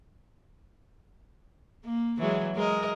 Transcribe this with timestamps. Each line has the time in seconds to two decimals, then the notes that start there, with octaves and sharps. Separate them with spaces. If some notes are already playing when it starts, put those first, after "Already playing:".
1.85 A#3
2.18 E3 F#3 G#3
2.55 G#3 A#4 D#5